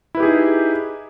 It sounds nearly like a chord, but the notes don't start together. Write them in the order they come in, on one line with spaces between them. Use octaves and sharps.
E4 B4 G4 G#4 D#4